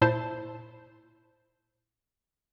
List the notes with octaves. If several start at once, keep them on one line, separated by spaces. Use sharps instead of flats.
A#2 E4 C5 A5